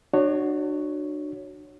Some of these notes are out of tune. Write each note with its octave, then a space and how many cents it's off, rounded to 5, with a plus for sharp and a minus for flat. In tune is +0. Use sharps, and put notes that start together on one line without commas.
D4 +35 F#4 +0 C#5 +0